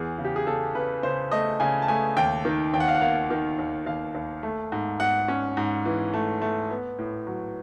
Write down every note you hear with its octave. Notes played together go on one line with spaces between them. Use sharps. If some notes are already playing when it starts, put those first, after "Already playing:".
Already playing: E2 G#4
C#3
G4
G#4
C#3 A4
C#3 B4
C#3 C5
A3 D#5
C#3 G#5
A5
A3 G#5
D#2 G5
D#3
D#2 G5
F#5
F5
F#5
A#3 F5
D#3
D#2
D#2 F5
D#2
A3
G#2
G#2 F#5
C#4
G#2
E3
A3
A3
B3
A2
F#3